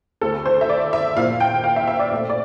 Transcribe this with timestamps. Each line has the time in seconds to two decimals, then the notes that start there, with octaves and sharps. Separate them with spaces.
0.21 D2 D3 A3 C4 A4
0.46 C5
0.61 E5
0.69 D5
0.93 E5
1.17 A#2 F3 A#3 F5
1.40 G5
1.64 F5
1.76 E5
1.88 E5
1.99 D5
2.11 A#2 A3 C4
2.29 D5